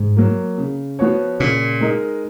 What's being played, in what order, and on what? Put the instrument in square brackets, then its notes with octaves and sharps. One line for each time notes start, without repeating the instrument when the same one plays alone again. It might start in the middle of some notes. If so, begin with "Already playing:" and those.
Already playing: [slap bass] G#2
[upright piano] F#3 A#3
C#3
F3 B3 F#4 C#5
[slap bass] A#2 [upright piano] C#3
[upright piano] G#3 D#4 A#4 D#5